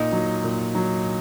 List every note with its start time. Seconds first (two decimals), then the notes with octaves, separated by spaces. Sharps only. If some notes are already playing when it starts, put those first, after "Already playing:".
Already playing: A#2 D#4
0.13 F#3
0.44 A#2
0.75 F#3